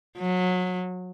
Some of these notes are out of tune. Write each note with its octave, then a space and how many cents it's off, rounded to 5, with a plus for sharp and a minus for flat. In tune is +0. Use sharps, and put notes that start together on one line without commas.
F#3 -25